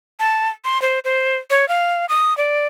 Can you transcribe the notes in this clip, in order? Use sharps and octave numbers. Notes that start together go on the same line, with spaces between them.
A5
C6
C5
C5
C#5
F5
D#6
D5